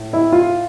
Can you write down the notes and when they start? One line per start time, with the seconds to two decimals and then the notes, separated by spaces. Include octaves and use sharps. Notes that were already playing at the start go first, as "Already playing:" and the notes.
Already playing: A2
0.13 E4
0.32 F4